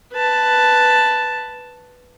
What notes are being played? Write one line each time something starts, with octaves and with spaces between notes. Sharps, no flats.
B4 A5